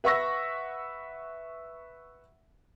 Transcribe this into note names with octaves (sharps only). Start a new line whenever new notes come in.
B4 E5 F#5 C#6 E6 A#6